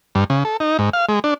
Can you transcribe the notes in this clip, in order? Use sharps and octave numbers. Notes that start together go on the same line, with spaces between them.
G2
C#3
A4
D#4
G#2
F5
G#3
D4